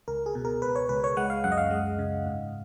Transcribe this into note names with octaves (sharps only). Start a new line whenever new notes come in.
C#2 A#4
G#4
B2
A#4
C#2 B4
C#5
C#2 B4
C#5
G#3 F#5
F5
F#2 F#5
D#5
F5
G#3
C#3
G#2